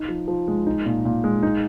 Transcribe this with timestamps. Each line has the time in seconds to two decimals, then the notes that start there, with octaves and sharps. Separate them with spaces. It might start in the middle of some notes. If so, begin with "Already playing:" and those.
Already playing: D#4
0.08 F3
0.28 F3
0.48 G#3
0.67 D#4
0.86 A#2
1.05 A#2
1.24 G#3
1.43 D#4